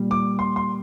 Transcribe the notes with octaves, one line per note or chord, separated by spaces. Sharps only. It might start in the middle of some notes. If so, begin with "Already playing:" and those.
Already playing: A#2 G3
D6
C6
C6